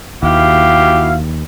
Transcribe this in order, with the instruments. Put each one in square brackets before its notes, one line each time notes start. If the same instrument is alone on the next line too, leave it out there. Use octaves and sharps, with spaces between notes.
[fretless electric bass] D#2 [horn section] E4 F#4 F5 [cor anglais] G4